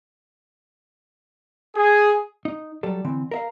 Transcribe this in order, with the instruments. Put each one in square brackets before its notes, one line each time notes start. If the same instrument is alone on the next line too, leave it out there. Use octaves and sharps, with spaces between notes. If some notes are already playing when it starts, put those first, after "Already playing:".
[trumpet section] G#4
[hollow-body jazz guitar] D#4
F#3 G3 A4
D3 E3 C4
A#4 E5 F5